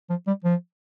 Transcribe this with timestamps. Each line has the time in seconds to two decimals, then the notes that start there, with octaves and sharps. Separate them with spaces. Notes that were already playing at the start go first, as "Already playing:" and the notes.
0.10 F3
0.27 G3
0.44 F3